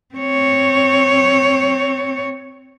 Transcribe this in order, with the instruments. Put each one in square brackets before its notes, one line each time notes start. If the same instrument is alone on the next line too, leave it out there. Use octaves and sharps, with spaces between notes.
[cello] C4 C#5